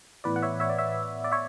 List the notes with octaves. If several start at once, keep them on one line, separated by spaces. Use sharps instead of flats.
A2 E3 B3 B4 D5
F#5
C#5 E5
C#5 E5
D5
C#5 E5
D5
C#5 E5